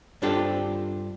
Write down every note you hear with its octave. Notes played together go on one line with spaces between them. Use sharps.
G2 C4 D4 F4 G4 A4